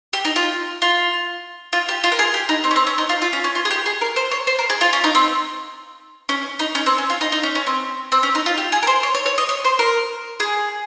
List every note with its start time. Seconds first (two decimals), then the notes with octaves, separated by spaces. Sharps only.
0.13 G4
0.25 D#4
0.36 F4
0.82 F4
1.73 F4
1.89 G4
2.04 F4
2.12 A#4
2.19 G#4
2.34 G4
2.49 D#4
2.64 C4
2.71 C#4
2.76 C4
2.87 C#4
2.98 D#4
3.09 F4
3.22 F4
3.33 C#4
3.44 C#4
3.55 F4
3.65 G#4
3.71 G4
3.86 G#4
4.01 A#4
4.16 C5
4.31 C#5
4.47 C5
4.59 A#4
4.70 G#4
4.81 F4
4.93 C#4
5.04 D#4
5.15 C4
6.29 C#4
6.59 D#4
6.75 C#4
6.86 C4
6.98 C#4
7.10 F4
7.21 D#4
7.32 D#4
7.43 C#4
7.55 C#4
7.67 C4
8.12 C4
8.23 C#4
8.35 D#4
8.46 F4
8.58 G4
8.72 G#4
8.83 A#4
8.87 C5
9.03 C#5
9.15 C#5
9.26 C#5
9.38 D#5
9.49 C#5
9.64 C5
9.79 A#4
10.40 G#4